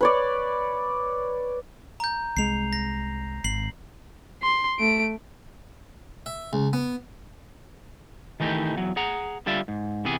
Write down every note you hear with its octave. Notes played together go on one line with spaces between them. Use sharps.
B4 C#5 D5
A#5 G6
C2 G#3 C7 F7
A#6
G#1 C7 F#7
C6
A3 D7
E5
C#2
B3
D#3 E3 A3 D#4 G4
E2 F#3
G#4 F#5 A#5
D3 G3 F4 D5 E5
G#2
C3 E3 B3 G#4